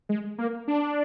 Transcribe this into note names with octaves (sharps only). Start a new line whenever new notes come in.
G#3
A#3
D4